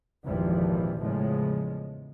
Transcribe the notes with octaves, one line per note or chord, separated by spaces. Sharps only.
G#1 F2 A#2 E3 F3 G3
E2 A2 C#3 F3 G#3